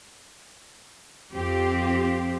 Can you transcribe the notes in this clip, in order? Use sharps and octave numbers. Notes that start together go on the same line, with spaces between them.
F2 C4 F4 G4